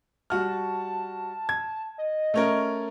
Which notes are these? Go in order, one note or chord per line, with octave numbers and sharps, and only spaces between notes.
G3 F#4 A5 F6
G#6
D#5
A3 C#4 A#4